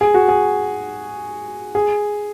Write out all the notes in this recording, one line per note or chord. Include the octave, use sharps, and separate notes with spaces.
G#4
F#4
G#4
G#4